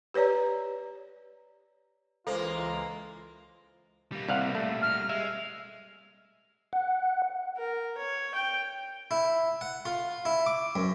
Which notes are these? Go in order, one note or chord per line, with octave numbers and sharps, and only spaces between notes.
G4 B4 C#5 D5 A#5
C#2 E3 G#3 A#3 F4 A4 C5
G3 A#3
C2 F5 F#5
A3
F6
G#3 E5
F#5
A#4
C#5
G5
E4
F#5
F4
E4
D6
F#2